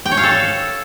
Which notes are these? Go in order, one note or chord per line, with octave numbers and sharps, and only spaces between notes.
G5
C#5
F5
A4